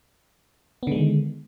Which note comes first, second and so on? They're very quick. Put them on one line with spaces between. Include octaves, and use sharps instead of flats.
B3 D3 G#3 D#3